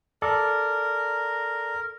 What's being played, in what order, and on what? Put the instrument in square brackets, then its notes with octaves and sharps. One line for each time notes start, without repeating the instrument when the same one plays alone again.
[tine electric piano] A4 D5 [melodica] A#4